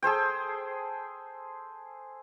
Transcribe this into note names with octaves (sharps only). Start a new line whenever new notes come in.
G#4 A4 C5 G5